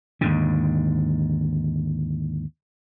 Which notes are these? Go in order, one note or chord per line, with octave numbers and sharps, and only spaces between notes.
D#2 G#2 D3